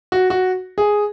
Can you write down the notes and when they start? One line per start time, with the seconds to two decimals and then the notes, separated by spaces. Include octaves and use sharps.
0.12 F#4
0.30 F#4
0.78 G#4